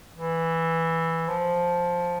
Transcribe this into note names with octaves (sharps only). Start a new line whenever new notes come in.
E3
F3